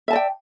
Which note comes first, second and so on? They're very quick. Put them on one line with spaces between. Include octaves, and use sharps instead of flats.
E5 A5 D5 G5